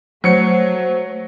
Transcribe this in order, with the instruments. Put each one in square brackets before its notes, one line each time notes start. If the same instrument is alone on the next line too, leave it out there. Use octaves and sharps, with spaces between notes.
[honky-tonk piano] F#3 C#7 [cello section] A3 [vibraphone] C5